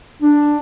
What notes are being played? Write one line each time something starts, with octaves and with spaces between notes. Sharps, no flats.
D4